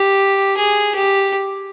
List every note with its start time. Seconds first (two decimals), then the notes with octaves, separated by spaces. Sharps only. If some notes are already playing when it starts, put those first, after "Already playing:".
Already playing: G4
0.57 G#4
0.95 G4